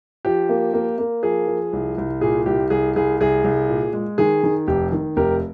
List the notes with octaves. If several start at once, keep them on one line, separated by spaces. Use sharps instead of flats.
F3 G4
A#3
A#3
A#3
F3 G#4
F3
C2
C2
A#2 G#4
C2 G4
C2 G#4
C2 G#4
C2 G#4
C2
A#2
G#3
D#3 G#4
D#3
F1 G4
D#3
F1 G4 A#4